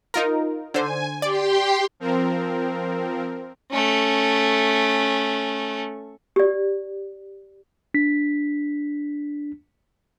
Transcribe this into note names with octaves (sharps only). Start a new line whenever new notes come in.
D#4 F4 A#4
D3 C5 G#5
G4 D5 G5 C6
F3 C4 A#4
A3 C#4
G4 D5
D4 B6